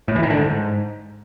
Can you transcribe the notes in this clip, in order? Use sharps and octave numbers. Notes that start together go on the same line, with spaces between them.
A2
E3
D#3
D3
G#2